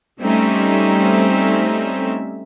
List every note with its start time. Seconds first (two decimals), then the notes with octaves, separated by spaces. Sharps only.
0.21 G3 A3 C4 C#4 D#4 E5